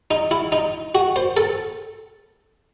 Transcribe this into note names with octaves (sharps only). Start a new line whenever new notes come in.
D#4
E4
D#4
F#4
C5
A4